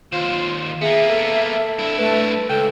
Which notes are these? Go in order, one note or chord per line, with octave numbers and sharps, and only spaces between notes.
D#2 F4 C5
A#3 B3 G#4 E5
A4
G2 E4
A3 B4
C#2 A4 G5